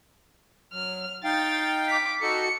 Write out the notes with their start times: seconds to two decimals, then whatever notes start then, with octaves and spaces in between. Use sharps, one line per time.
0.73 F#3 F6
1.24 D#4 F5 G5 A6
1.88 D6 B6
2.22 D#4 F#4 A4 C#7